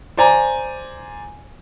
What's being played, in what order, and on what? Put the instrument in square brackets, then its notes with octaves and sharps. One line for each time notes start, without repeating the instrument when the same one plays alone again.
[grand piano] C5 D5 G#5 A#5